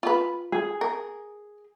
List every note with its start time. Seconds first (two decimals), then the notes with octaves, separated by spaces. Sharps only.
0.03 F4 B4
0.52 G#4
0.81 A#4